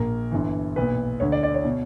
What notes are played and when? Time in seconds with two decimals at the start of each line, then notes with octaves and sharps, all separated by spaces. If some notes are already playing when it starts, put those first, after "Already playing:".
Already playing: A#1 A#2 A#4
0.31 G1 G2 E3
0.76 B1 A#2 B4
1.20 D2 D3 C#5
1.32 D5
1.43 D5
1.54 C#5
1.65 B2